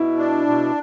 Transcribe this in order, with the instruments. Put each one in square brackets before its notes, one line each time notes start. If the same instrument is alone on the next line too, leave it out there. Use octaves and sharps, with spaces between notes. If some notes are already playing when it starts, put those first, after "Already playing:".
Already playing: [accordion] B2 [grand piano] E4
[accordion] D4
B2